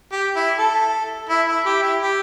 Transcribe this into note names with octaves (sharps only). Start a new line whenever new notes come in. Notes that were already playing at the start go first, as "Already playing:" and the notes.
G4
E4
A4
E4
E4
G4
E4
G4